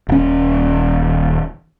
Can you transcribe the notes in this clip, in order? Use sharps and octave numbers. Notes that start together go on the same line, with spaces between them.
D#1 C#4